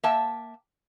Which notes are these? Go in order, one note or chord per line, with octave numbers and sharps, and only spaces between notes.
A#3 E5 G5 A5